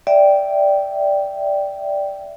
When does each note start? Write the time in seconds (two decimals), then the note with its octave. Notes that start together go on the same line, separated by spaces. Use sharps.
0.07 D5 E5 G5